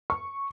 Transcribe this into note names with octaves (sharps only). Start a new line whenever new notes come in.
C#6